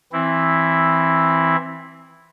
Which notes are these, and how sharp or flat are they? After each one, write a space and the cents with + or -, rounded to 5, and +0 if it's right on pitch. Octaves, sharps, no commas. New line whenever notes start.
E3 +0 C4 +10 E4 +0